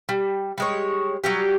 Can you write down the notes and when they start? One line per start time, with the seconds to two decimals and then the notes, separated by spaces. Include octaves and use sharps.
0.09 G3
0.58 G3 G#3 C#5
1.24 F#3 G3 G4